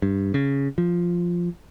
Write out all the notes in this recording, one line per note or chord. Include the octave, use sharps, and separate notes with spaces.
G2
C#3
F3